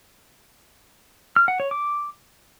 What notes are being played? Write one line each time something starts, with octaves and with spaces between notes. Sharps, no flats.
F6
F#5
C#5
D6